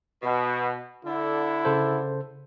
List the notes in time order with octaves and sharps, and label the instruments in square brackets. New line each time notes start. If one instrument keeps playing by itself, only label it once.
[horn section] B2
[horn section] D3 [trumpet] E4
[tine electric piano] C#3 A4 C5